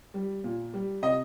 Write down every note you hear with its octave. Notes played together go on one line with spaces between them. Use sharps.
G3
A#2
G3
C3 D#5